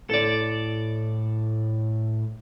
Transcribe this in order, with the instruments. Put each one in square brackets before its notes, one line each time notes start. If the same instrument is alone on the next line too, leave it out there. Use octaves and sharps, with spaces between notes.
[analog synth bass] A2 [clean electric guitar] A4 D5